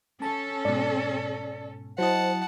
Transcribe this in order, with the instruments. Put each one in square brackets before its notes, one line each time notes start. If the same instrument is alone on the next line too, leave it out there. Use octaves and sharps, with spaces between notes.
[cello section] C#4 A4 [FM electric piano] A5
[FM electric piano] G#2 B2 [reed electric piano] D5
[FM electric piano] F#3 E4 D#5 [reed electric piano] C5 [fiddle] F#5 A5